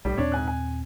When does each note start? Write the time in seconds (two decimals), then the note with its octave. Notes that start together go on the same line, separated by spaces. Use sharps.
0.05 B1 A2 G3
0.18 D#2 A#2 C4 D4 C#5
0.32 G#2 G#5 F#6
0.48 G#5